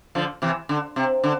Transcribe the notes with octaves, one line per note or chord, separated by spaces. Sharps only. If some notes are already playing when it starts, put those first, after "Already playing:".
D3 F3
C3 E3
D3
C3
D3